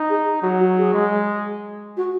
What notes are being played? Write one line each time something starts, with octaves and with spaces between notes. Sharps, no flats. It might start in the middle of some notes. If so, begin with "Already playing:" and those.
Already playing: D#4
G#4
F#3 F#4
F#4
G#4
G#3
F#4